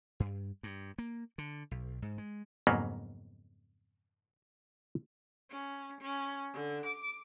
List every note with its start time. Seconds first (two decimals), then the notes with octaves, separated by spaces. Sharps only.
0.20 G2
0.63 G2
0.98 A#3
1.38 D3
1.71 B1
2.02 G#2
2.18 G#3
2.67 F2 G#2 C#3 F#3 A#3 B3
5.50 C#4
6.01 C#4
6.54 D3
6.86 D6